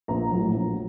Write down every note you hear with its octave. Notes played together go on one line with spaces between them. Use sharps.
A#1 A#5
A2 F#3
A#1